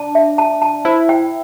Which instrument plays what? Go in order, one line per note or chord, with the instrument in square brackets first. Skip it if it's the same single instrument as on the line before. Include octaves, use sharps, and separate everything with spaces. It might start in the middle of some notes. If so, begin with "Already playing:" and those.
Already playing: [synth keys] D4 [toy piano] A5
[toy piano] E5
A5
A5
[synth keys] E4 [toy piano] C5
[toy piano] G5